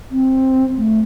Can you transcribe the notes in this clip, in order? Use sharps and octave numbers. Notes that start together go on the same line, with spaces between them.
C4
A3